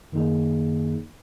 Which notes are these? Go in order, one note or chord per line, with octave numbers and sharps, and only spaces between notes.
F#2 D#3 A#3 D#4 G#4